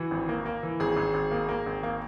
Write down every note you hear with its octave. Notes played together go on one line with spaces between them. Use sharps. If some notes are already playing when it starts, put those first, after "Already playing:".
Already playing: E3 F#4
G#1
A#3
A#3
E3
G#1 G#4
G#1
G#1
A#3
A#3
G#1
A#3